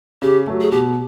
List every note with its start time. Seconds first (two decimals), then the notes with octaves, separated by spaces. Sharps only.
0.22 C#3 G4
0.47 F#3 A3
0.61 G#4
0.71 B2 G4